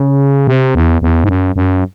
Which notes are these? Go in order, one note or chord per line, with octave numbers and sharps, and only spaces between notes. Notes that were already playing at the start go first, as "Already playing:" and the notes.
Already playing: C#3
C3
E2
E2
G#2
F#2
F#2